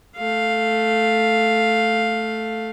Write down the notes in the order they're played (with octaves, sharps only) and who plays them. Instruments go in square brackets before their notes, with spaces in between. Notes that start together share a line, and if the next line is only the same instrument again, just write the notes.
[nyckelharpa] A3 F5